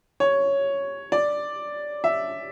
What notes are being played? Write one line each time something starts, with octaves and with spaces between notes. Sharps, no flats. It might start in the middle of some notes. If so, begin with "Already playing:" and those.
C#5
D5
E5